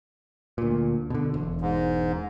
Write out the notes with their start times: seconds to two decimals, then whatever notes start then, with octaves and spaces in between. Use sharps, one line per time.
0.58 D2 A#2
1.10 B2 D3
1.34 E1
1.61 G#2